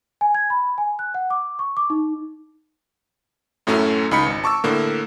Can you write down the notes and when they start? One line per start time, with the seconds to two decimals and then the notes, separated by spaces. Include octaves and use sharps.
0.21 G#5
0.35 G#6
0.50 B5
0.78 G#5
0.99 F#6
1.14 F#5
1.30 D6
1.59 C#6
1.77 D6
1.90 D#4
3.67 F#2 A2 F#3 A3 C#4
4.11 C#2 D#4 B5 C#7
4.26 G#1
4.44 A5 C#6 D6 E6
4.64 A2 D3 A#3